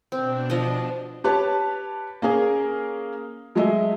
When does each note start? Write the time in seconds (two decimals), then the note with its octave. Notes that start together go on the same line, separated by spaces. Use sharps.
0.12 B2 C4 D4
0.50 F3 D#5
1.24 G4 B4 C#5 A5
2.22 A#3 C#4 G#4 A#4
3.55 F#3 G#3 A3 F#4 D#5 E5